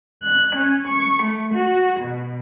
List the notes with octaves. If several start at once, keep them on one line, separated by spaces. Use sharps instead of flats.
F#6
C#4
C#6
A3
F#4
B2